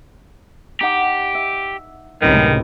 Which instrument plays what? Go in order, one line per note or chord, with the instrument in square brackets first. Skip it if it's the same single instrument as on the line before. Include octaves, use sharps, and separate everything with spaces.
[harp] D#4 F#5 D6 [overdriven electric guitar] G4
[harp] E5
[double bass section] C#2 A2 C3 [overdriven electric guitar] F#2 [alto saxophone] D#3 [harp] B4